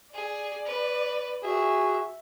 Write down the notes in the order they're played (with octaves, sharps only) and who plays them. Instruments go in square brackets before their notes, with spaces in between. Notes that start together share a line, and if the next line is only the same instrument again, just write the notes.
[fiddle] G#4 [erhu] D5
[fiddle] B4
[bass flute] F#4 [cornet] G#4 [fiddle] E5